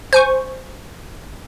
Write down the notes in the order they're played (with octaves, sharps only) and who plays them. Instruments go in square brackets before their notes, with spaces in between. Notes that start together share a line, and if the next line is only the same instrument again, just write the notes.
[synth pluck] C5 G#5 C#6